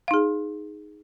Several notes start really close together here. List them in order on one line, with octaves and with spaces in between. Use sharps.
F5 D#4 G#4